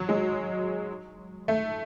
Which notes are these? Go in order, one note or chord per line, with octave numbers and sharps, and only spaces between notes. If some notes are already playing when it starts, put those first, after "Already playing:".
Already playing: F#3
G#3
A3